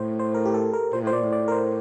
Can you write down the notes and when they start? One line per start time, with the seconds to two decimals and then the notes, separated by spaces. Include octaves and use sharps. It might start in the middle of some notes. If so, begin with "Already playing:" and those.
Already playing: A2 C5
0.19 C5
0.34 A#4
0.45 G4
0.54 A4
0.73 A#4
0.93 A#2 C5
1.02 A2
1.07 C5
1.11 A#2 D5
1.23 A2
1.32 D5
1.48 A#4
1.52 C5